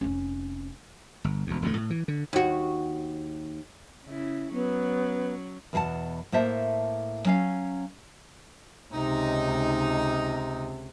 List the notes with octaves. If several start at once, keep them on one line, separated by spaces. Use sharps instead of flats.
F1 C#4
G1
E1 D2
E1 D2 A2 A3
A2
E3
D3
D#2 F#4
C#3 E4
F#3 B3 C#4
E2 B2 G#4 F#5 A5
A2 A#3 C5 E5 A5
F#3 C#4 F5
C#2 C3 D#4